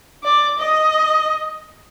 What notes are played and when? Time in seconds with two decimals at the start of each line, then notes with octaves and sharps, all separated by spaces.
0.23 D5
0.58 D#5